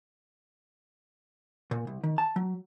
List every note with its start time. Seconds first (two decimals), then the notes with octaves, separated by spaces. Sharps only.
1.71 A#2
1.87 C2
2.03 D#3
2.18 A5
2.36 F#3